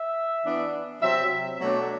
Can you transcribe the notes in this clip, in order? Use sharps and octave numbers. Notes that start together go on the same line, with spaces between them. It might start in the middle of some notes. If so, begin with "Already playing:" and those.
Already playing: E5
E3 B3 D4
C3 F#3 C4 E5
B2 F#3 A3 D4